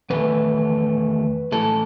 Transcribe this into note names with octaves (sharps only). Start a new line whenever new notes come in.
E2 D#3 A3 B4
A2 E3 G#3 A4